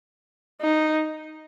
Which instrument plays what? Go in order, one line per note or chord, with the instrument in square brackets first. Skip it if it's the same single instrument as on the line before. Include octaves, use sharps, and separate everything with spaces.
[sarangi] D#4